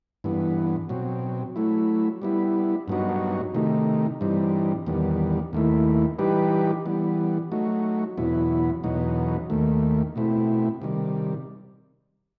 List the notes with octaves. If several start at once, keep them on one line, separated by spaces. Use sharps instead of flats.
G2 E3 B3
B2 F#3 C4
F#3 A3 E4
G3 B3 E4
G2 F#3 B3 D#4 F#4
C3 D#3 A3 D#4
G2 E3 G3 C4 D#4
E2 D#3 G3 B3
D#2 D#3 A3 E4
E3 G3 D#4 G4 B4
E3 G3 B3
F#3 A3 D#4 F#4
E2 B2 F#3 B3 E4
E2 B2 F#3 B3 D#4
D#2 D#3 A3
B2 A3 C4 E4
C3 D#3 G3